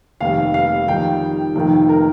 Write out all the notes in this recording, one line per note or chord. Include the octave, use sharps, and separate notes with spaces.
F1 D#2 D#3 G3 F5
F5
F2 D#3 G3 D#4 G5
F1 F2 D#3 A#3 D#4
A#4